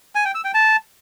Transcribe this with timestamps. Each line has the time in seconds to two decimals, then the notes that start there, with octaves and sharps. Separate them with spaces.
0.15 G#5
0.25 G5
0.35 E6
0.45 G5
0.54 A5